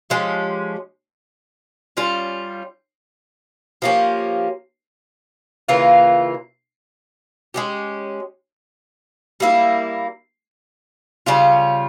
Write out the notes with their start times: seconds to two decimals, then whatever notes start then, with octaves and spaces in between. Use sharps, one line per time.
0.10 F3 G#3 C#4 G4
1.97 G3 C#4 F4
3.82 F3 A#3 C#4 G4
5.68 C#3 E3 A#3 F4
7.54 G#3 C#4 G4
9.40 G3 A#3 E4
11.26 C#3 G3 C#4 F4